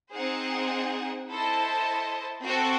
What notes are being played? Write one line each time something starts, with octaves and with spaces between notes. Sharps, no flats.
C4 D#4 G#4 C5 F#5
E4 A4 C5 D#5 A5
C4 F#4 A4